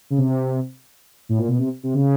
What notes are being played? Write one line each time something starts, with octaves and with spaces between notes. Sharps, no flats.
C#3
C3
A2
A#2
B2
C3
C3
C#3